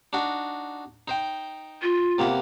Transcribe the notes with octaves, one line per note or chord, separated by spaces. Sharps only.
D4 D#4 F#4
D#4 C5 G5
F4
C3 A#3 B3